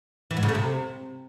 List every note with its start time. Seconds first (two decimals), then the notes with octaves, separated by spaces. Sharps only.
0.31 E3
0.37 G#2
0.43 C#3
0.49 A3
0.55 C3